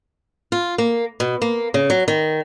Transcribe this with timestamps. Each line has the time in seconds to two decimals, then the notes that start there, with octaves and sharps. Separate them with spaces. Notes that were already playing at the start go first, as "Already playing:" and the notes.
0.52 F4
0.78 A#3
1.20 B2
1.42 A#3
1.74 C#3
1.90 F#3
2.08 D#3